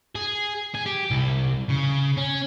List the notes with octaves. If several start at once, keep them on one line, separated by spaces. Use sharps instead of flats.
G#4
G#4
G4
C2
C#3
C#4